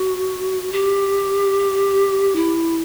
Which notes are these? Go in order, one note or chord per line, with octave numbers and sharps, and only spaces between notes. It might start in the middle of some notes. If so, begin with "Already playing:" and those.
Already playing: F#4
G4
E4